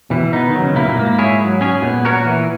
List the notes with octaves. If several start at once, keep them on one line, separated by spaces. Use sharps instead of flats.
B2 E3
B3 D#4
D#3
F#3
C#3
B2 A#3 E4
A#2
G#2 A#3
E4 G#4 C#5
F#3
C#4 G#4 C#5
A#2 B3
F#4 A#4 C#5
E3